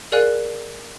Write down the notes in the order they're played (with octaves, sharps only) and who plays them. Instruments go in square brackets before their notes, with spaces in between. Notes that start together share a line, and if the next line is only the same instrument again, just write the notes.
[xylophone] G#4 A#4 D5 F5 G#5 F#6